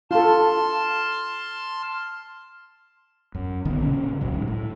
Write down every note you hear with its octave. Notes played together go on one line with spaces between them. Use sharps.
F4 A4 A5 C6 F6
F#2
A#1 D3 D#3 B3
A#2 C#3 C#4
F#1 C#2 A#2 F#3
G#2
A2